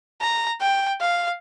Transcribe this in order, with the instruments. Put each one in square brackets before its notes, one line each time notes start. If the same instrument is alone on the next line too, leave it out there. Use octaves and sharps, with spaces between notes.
[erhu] A#5
G5
F5